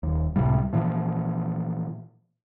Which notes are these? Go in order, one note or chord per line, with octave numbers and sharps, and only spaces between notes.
D#1 D#2
C#2 A2 C3 G3
A#2 E3 F3